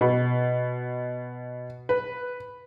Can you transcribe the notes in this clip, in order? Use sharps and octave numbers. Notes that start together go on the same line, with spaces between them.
B2
B4